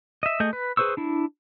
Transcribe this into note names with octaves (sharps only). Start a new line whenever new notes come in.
D#5 E5
A3 G#4 D#5 G6
B4
G#4 B4 C5 C#6 E6
D4 E4